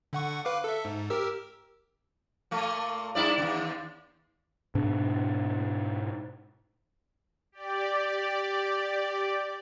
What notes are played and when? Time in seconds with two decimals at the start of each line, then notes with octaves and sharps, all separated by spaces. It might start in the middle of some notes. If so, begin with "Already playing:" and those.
0.13 D3 F#5 C#6
0.45 B4 F5 D6
0.64 A4 E5
0.85 G#2
1.10 G4 A#4 E6
2.51 A#2 A3 A#3
3.15 G2 E4 D5
3.38 D#2 C#3
4.75 G#2 B2 D4
7.52 G4 D5